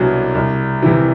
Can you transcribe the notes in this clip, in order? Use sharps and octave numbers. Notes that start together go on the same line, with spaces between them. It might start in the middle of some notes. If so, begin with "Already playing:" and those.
Already playing: C2 B2 F#3 D4
C2
C3 E3